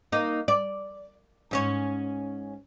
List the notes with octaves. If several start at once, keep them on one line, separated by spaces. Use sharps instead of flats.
A#3 D#4
D5
G#2 C#4 C#5